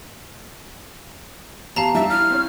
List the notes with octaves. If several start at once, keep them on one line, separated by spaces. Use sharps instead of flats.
E2 G4 F5 A5 A#5
G3 D4 E5
E4 F6
C4 C#5